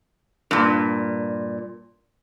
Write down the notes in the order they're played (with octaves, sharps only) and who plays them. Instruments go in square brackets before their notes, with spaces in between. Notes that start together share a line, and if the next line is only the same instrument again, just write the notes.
[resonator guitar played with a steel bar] G2 A#2